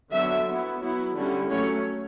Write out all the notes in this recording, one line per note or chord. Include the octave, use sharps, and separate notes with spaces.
D3 F#3 B3 D4 E5
F#3 B3 E4
F#3 B3 E4
D3 G3 C#4 E4
F#3 A3 C#4 C#5